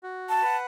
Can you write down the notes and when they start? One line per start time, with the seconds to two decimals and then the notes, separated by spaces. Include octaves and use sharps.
0.03 F#4
0.29 A5
0.42 B4 F#5